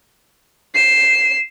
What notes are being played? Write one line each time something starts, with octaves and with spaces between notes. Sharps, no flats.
C7 E7